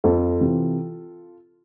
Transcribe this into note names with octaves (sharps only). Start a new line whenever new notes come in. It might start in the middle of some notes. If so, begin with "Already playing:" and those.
F2 F4 A4
C3 E3